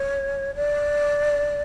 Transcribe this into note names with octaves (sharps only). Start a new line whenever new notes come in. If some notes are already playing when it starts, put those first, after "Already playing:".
Already playing: C#5
D5